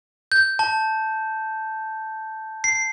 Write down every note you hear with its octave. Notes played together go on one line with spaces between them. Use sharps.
G6
A5
C7